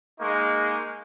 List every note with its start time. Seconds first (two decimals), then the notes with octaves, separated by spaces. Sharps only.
0.20 G#3 A#3 D#4 C#6